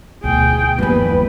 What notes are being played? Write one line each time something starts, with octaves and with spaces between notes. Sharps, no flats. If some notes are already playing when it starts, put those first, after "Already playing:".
D2 B2 G#4 G5
F#1 D#2 F3 G3 B3 B4